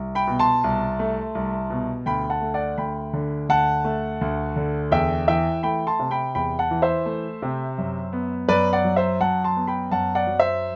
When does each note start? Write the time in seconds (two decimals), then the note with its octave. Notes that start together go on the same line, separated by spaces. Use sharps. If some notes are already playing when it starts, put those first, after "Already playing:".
Already playing: C2
0.15 G5 B5
0.27 B2
0.39 A5 C6
0.64 C2
0.99 A3
1.35 C2
1.70 B2
2.06 D2 G5 B5
2.30 F#5 A5
2.41 A3
2.54 D5 F#5
2.78 D2 G5 B5
3.13 D3
3.49 D2 F#5 A5
3.85 A3
4.21 D2
4.56 D3
4.91 E2 E5 G5
5.28 E3 E5 G5
5.63 A3 G5 B5
5.87 A5 C6
5.99 C3
6.11 G5 B5
6.35 E2 G5 B5
6.59 F#5 A5
6.71 E3
6.82 C5 E5
7.06 A3
7.42 C3
7.78 F#2
8.13 B3
8.48 F#2 B4 D5
8.73 D5 F#5
8.84 F#3
8.96 C5 E5
9.20 F#2 F#5 A5
9.44 A5 C6
9.56 B3
9.67 G5 B5
9.91 F#2 F#5 A5
10.15 D5 F#5
10.27 F#3
10.39 C5 E5